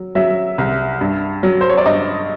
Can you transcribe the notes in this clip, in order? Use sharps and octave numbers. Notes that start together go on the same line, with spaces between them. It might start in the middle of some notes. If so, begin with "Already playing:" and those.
Already playing: F#3
F#3 E5
C2
G2
F#3
C5
C#5
D5
G2 D#5